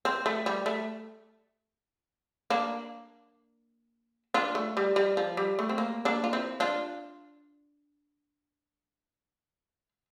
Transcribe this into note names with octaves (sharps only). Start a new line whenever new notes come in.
C4
A3
G3
A3
A#3 D4
D4 F4
A3
G3
G3
F3
G3
A3
C4
A#3
A#3 D4
F4
C4 E4
D4 F4